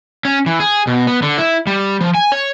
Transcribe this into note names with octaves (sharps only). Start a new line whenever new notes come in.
C#4
E3
G#4
B2
B3
D3
E4
G3
F3
G#5
C#5